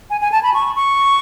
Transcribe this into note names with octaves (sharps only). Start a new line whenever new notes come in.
G#5
G#5
A5
B5
C#6
C#6